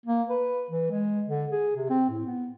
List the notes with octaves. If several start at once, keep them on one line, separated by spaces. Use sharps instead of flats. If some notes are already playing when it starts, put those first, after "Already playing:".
A#3
B4
E3
G#3
D3
G#4
C3
C4
A2
B3